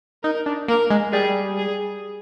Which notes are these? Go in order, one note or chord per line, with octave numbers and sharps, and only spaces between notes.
D#4 A#4
D4
A#3 A#4
G#3
G3 G#4
G#4